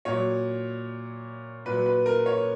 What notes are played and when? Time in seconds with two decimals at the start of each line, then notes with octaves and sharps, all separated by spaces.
0.05 A#2 F#3 C#5
1.65 A#2 F#3 B4
1.86 B4
2.06 A#4
2.26 C#5